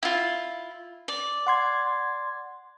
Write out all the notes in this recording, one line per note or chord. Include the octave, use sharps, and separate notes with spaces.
E4 F4
D5
F#5 C6 G#6